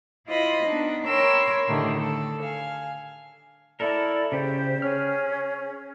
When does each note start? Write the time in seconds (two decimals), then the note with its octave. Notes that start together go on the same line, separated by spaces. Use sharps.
0.28 E4 F4 C5 D#5 B5
0.64 B3 D4 D#4
1.08 A#4 C#5 G5 B5 C6 E6
1.68 A2 D3 D#3 G3 A3
1.98 A4
2.42 F5 G#5
3.80 E4 A4 A#4 D5
4.32 C#3 G4 C5
4.82 C#4 G#4 F6